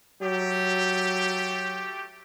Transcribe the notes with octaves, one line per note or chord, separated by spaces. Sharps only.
F#3 A3 G4